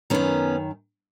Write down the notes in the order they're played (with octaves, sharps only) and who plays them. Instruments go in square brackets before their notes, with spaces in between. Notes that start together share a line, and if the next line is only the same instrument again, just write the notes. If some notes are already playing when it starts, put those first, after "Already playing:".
[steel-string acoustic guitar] F#2 D#3 B3 C#4